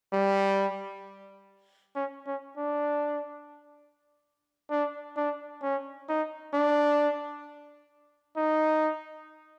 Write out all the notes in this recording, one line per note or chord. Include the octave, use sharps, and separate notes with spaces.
G3
C#4
C#4
D4
D4
D4
C#4
D#4
D4
D#4